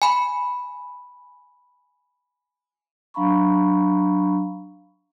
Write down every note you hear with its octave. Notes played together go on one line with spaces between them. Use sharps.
G#5 B5
F#3 D4 F5 A#5 B5 C#6